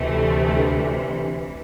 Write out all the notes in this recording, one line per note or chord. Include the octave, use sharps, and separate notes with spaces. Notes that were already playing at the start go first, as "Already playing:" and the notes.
Already playing: D2 C3 E3 A3